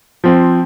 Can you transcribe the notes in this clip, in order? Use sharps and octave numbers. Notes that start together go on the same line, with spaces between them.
F3 C4